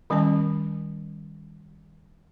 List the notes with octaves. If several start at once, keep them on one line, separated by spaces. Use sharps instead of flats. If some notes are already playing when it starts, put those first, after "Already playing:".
D#3 G3 C#4 D#5 A5